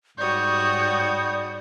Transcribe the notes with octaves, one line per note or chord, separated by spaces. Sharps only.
G#2 G3 F#4 C#5 D5 D#6 G6